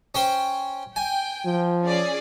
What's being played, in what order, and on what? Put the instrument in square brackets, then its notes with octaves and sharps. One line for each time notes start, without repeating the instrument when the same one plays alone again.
[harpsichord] C#4 C5 G5
[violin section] G5 [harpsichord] G#5
[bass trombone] F3
[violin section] C#4 G#4 D5